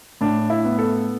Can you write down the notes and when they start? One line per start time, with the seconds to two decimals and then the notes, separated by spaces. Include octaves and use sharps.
0.21 A2 D4
0.50 E4
0.65 B3
0.79 A4